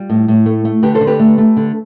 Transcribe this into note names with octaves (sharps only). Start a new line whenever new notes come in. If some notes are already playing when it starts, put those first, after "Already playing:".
Already playing: G3 F4
A2
A2
A3
A3
D3 G4 B4
A4 C5
D3
G4 B4
A3
A3
D3